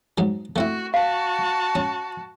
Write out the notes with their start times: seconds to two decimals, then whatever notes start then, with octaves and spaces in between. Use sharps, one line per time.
0.18 G#2 F#3
0.56 A3 C4 E4 F#4
0.94 F#4 F5 A5
1.75 C#4